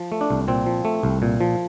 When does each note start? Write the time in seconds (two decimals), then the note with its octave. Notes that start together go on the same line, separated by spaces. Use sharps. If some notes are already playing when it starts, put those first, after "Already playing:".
Already playing: F3
0.12 A3
0.21 D4
0.30 C2
0.48 A#2 C4
0.66 F3
0.85 A3
1.03 C2
1.22 A#2
1.41 F3